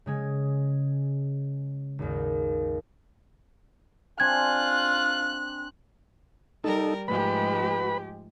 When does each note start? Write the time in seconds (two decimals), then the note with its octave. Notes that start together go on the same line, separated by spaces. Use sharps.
0.06 C#3 G#3 G#5
1.99 G#1 D#2
4.20 C4 D4 F4 G#5 F#6 G#6
6.64 G3 D#4 A4 A#4
7.08 G#2 F3 G#3 A3 G4 B4 B5